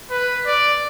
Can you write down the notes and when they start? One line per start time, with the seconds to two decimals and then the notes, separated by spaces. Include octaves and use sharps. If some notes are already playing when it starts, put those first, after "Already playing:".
0.10 B4
0.47 D5